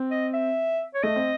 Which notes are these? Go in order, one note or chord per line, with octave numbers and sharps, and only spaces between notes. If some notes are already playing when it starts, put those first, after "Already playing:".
Already playing: C4
D#5
E5
C#5
A3 D#5
C4